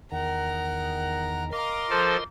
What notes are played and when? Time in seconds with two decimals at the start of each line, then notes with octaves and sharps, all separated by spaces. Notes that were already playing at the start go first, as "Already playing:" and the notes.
0.12 E2 D#3 A#4 F#5 A#5
1.52 A#4 D#5 F5 A#5 C6 D6
1.90 F3 A4 C5